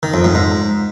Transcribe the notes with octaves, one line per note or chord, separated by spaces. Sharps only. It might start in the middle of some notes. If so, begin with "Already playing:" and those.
D#3
F2
G#2
G#2